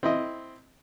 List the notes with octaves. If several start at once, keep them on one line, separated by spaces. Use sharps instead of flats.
C4 E4 D#5